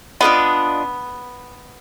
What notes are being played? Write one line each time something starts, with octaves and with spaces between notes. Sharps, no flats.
B3 D4 F4 A#4 D#5